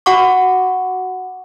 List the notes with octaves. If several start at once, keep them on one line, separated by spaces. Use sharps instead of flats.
F#4 F#5 C#6 D6